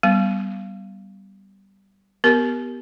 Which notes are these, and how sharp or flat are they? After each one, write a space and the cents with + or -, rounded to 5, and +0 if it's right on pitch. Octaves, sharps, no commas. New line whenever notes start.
G3 -5 B3 +0
B3 +0 G4 -10 A#4 +0